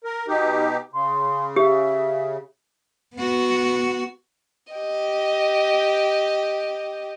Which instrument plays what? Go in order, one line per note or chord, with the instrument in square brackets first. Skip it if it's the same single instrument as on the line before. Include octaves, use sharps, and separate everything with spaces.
[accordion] A#4
B2 D#4 G4
[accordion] C#3 [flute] C6
[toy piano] G4 [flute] E5
[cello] B3 F#4
[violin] G4 D#5